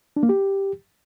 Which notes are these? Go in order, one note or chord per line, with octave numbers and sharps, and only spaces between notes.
D4
A#3
G4